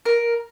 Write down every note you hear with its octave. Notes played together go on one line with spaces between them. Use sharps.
A#4